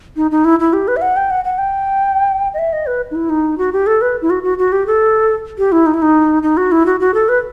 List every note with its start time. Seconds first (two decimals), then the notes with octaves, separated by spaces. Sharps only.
0.16 D#4
0.31 D#4
0.45 E4
0.60 E4
0.73 G4
0.88 B4
0.97 E5
1.02 F#5
1.17 G5
1.30 F#5
1.45 F#5
1.58 G5
2.54 D#5
2.59 E5
2.73 D#5
2.87 B4
3.11 D#4
3.15 E4
3.30 D#4
3.58 F#4
3.73 G4
3.87 A4
4.02 B4
4.22 E4
4.30 F#4
4.44 F#4
4.58 F#4
4.72 G4
4.86 A4
5.58 G4
5.72 E4
5.86 D#4
5.94 E4
6.02 D#4
6.43 D#4
6.57 F#4
6.72 E4
6.86 F#4
7.00 F#4
7.14 A4
7.29 B4